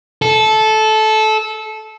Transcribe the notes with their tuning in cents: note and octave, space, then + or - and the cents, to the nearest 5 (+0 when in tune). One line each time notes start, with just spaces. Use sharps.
A4 -15